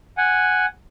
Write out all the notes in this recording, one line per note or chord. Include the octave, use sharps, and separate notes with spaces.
F#5 G#5